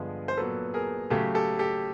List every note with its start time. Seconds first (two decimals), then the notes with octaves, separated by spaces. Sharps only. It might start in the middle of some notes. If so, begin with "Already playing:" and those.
Already playing: G2 D3 F3 G#3 B3 G#4
0.28 C5
0.37 A#2 F#3 B3 A4 B4
0.74 G#4 A#4
1.10 C#3 F#3 A3 G4 A4
1.35 G4 A4
1.59 G4 A4